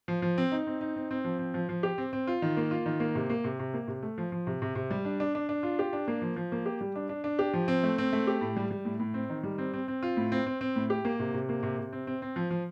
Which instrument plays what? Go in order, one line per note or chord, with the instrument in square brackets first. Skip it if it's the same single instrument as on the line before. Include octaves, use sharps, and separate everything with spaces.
[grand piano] F3
F3
C4
D#4
C4
D#4
C4
C4
F3
C4
F3
F3
G4
C4
C4
F4
D#3
A#3
F4
D#3
A#3
C3
A#3
C3
C3
A#3
C3
A3
F3
F3
C3
C3
C3
G3
D4
D4
D4
D4
F4
G4
D4
A#3
F3
F3
A#3
G4
G3
D4
D4
D4
G4
F3
C4
A3
C4
A3
G4
A2
G3
G3
A2
A2
C4
D#3
G3
C4
C4
C4
F4
A2
C4
C4
C4
A2
G4
A#3
C3
C3
A#3
C3
C3
C4
C4
C4
F3
F3